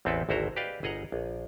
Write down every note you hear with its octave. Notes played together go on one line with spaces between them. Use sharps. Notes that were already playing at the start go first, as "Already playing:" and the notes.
A1 E2 C4 E4 A4 B4
G#1 D2 E4 F#4 C5 A#5
G4 B4 D5 D#5 F5 G5
G1 G#4 D#5 F#5 A#5
A#1